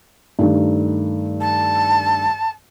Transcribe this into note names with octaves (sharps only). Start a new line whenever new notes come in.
G2 D#3 A3
A5